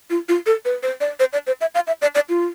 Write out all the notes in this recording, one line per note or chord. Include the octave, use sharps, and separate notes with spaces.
F4
F4
A4
B4
C5
D5
C5
D5
C5
E5
F5
E5
D5
D5
F4